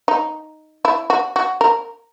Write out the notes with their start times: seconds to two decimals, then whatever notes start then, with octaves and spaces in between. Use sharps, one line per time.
0.08 D#4
0.85 E4
1.10 F#4
1.36 F#4
1.61 A#4